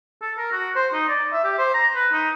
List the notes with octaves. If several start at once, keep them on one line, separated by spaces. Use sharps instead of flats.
A4
A#4
F#4
C5
D#4
D5
E5
G4
C5
A#5
B4
D#4